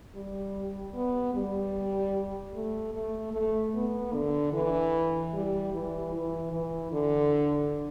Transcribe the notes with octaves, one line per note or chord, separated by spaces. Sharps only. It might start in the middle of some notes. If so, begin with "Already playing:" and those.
G3
B3
G3
A3
A3
A3
B3
D3
E3
G3
E3
E3
E3
D3